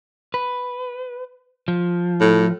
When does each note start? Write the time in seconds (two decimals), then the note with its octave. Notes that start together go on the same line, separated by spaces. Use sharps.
0.34 B4
1.68 F3
2.21 A2